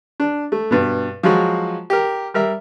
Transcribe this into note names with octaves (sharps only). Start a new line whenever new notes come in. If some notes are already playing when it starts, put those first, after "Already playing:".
D4
A3
G2 B2
F3 F#3 G#3 F4 F#4
G4 A#4
G3 A#4 E5